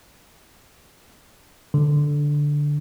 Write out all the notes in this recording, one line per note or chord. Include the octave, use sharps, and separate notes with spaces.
D3